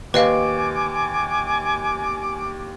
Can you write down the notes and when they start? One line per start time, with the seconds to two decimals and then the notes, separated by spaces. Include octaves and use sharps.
0.14 D#2 B4 D#5 F5 G#5 D6